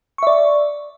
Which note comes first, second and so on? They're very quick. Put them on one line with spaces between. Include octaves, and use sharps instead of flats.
C#6 E5 D5